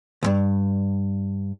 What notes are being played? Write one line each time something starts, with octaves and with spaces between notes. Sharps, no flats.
C#2 G2